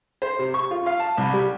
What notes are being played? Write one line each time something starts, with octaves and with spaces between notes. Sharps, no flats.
C5
C3
C#6
F4
F5
A5
C2
G3